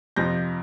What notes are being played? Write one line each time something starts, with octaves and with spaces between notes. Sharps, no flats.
F2 C3 F3 G6 A#6